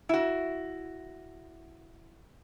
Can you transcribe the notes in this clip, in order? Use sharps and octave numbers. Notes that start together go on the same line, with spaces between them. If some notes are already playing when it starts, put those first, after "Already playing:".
E4 F#4